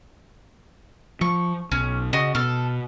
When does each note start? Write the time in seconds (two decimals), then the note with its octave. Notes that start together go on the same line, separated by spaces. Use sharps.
1.21 F3 C#6
1.72 B1 C#4
2.13 C#3 F#4 D#5
2.35 B2 A4 F6